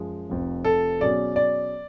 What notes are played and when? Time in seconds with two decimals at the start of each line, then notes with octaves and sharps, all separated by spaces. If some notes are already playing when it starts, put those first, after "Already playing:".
Already playing: F#2 F3 G#3
0.29 F1 F2 F3
0.65 A4
1.00 B2 F#3 C#4 G#4 D5
1.36 D5